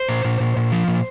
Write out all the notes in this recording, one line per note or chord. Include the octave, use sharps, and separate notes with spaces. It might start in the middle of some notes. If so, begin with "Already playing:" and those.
Already playing: C5
A#2
A#2
A#2
A#2
F3
A#2